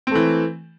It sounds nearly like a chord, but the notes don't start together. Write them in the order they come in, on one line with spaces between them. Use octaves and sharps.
C4 A3 E3